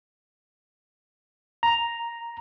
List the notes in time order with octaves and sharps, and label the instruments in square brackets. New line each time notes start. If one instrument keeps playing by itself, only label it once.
[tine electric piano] A#5